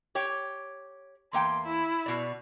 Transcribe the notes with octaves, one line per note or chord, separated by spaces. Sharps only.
G4 C#5 G5
E2 A#3 G5 C6
E4
B2 D5